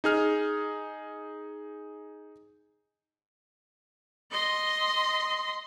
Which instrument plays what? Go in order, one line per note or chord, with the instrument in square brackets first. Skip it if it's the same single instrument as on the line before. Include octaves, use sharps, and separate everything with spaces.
[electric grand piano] D#4 G#4 F6
[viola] D#5 C6